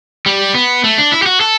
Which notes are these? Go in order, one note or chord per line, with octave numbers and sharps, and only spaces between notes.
G3
B3
A3
D4
E4
G4
F#4
A4